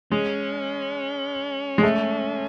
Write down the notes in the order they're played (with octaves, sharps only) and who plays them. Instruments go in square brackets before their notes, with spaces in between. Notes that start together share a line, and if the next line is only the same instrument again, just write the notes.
[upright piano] G#3 [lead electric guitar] C#4
[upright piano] G#3
A3